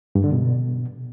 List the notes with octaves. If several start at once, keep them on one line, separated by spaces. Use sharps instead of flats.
G2
D3
B2